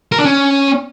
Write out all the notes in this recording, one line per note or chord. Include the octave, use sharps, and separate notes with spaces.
A#4
D4
C#4